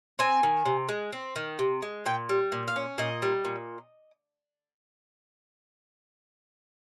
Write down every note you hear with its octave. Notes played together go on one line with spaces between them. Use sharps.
C4 G#5
D#3
C3
G#3
C4
D#3
C3
G#3
A#2 G5
G3
A#2
F5
C#4
A#2 D#5
G3
A#2